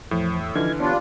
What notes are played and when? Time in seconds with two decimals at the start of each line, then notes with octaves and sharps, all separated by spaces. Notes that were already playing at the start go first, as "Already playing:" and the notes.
0.11 E2 A2 F3
0.40 E6
0.55 D3 E3 F3 D#4 F6 G#6
0.80 G3 B3 D4 F4 C#5 D5